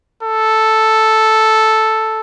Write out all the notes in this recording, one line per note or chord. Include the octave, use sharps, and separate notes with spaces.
A4